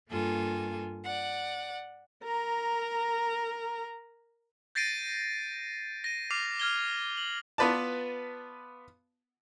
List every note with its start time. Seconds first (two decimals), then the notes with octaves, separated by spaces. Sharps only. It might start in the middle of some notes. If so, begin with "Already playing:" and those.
0.10 G2 A#3 F4 A4 G#5
1.04 D5 F#5
2.24 A#4 A#5
4.75 G6 A6 A#6 C7 D7 D#7
6.04 A#6 D#7
6.31 D6 F6 C7 F7
6.60 F6 G#6 G7
7.17 F#7
7.58 B3 F4 B4 D5 A5